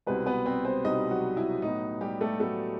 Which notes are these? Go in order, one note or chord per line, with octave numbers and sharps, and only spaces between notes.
C2 B2 G3 B3 C4 B4
B3 B4
C4 C5
C4 C5
C2 B2 G3 C4 D#4 D#5
F#3 F#4
E4
A2 F#3 B3 D#4
G3 G4
A3 A4
A2 F#3 A3 B3 A4